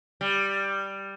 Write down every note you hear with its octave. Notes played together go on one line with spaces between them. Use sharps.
G3